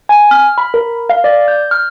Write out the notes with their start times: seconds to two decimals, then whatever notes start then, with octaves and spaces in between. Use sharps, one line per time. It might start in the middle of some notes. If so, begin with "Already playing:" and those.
0.09 G#5
0.31 F6
0.58 B5
0.74 A#4
1.10 F5
1.24 D5
1.48 G6
1.71 F6